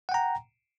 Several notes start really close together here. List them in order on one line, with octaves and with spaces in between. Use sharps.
F#5 G5 A#5